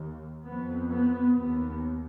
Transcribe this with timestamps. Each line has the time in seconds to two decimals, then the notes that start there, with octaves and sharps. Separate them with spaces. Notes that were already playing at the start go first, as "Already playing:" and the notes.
Already playing: D#2
0.46 F2 B3
0.91 B3
1.36 D#2 B3